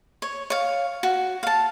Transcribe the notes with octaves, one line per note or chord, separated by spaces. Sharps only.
C#5
C#5 F5
F#4
F5 A5